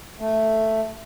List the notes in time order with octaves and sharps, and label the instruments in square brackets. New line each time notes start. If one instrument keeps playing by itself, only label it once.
[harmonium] A3